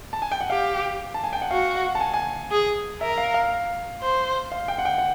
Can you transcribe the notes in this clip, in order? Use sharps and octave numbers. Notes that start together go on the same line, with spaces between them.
A5
G#5
G5
F#5
G4 F5
A5
G#5
G5
F#5
F#4 F5
F#5
A5
G#5
G#5
G#4
A#4 E5
F5
F5
C5
F5
G5
F#5
G5
F#5